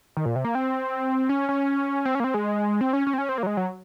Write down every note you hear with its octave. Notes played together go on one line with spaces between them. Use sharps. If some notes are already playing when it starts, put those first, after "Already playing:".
D#3
A#2
C3
A#3
C4
C#4
C#4
C4
C#4
A#3
C4
G#3
C4
C#4
C#4
C4
C#4
C4
A#3
F#3
G#3
F#3